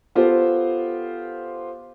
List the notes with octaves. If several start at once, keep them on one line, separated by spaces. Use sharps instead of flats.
B3 F4 G4 A4 C5